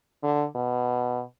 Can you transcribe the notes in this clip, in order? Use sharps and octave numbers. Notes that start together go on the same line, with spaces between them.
D3
B2